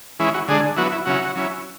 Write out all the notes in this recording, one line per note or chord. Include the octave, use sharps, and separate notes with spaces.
E3 G#3 C#4 E4
F#4
D3 G#3 D4 G#4
F#3 B3 E4 F#4
E4
C#3 F#3 C#4 E4 F#4
F#3 C#4 E4